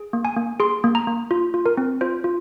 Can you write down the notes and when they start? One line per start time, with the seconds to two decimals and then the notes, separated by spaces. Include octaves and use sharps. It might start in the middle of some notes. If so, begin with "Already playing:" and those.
Already playing: G#4
0.13 A#3
0.25 G#5
0.37 A#3
0.60 G#4 C6
0.84 A#3
0.95 A#5
1.07 A#3
1.31 F4
1.54 F4
1.66 A#4
1.77 C4
2.01 F4 C5
2.24 F4